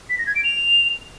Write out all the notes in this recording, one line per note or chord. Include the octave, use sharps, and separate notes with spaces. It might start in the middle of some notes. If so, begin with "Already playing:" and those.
B6
A#6
G#6
D7
F7